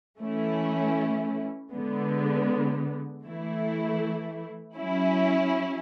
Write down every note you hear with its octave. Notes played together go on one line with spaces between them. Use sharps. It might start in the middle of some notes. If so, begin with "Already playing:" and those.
E3 A3 C#4 E4
D3 G#3 B3
E3 A3 E4
F#3 C#4 E4